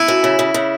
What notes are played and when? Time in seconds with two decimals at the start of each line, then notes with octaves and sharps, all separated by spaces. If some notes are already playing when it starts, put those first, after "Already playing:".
Already playing: A3 E4
0.08 F#2
0.24 C#3
0.39 C#3
0.54 C#3